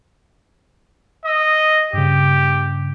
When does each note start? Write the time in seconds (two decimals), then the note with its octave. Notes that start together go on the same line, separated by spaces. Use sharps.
1.25 D#5 D#6 E6
1.93 G2 C#3 G4